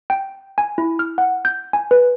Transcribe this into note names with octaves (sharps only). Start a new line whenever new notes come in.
G5
G#5
E4
F6
F#5
G6
G#5
B4